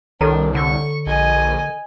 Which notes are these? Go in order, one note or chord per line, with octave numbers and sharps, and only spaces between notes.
C2 D#3 D4 A4 C#5 A#5
D3 C#6
A#1 D#5 G#5